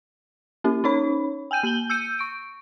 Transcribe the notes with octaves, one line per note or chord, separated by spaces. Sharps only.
A#3 C#4 E4 G4
C#4 D#4 C#5 B5
G5 G#5 G6 D#7
A#3 G6 F#7 G7
E6 G6 C#7 D#7
C#6 D7